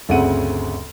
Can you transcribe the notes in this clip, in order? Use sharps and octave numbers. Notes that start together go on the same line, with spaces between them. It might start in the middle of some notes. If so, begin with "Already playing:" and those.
G1 D2 C#3 C4 F#5 D#7